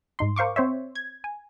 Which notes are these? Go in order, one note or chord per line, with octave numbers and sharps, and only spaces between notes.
G#2 D#4 C6
A#4 C5 F5 C#6 D6
C4 C5 C#5 E5
G#6
G#5